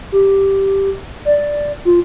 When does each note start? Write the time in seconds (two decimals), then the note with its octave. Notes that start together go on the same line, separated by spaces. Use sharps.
0.12 G4
1.25 D5
1.85 F4